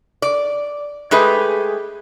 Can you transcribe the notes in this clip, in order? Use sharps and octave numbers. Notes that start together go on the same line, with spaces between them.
D5
G#3 A3 G4 G#4 B4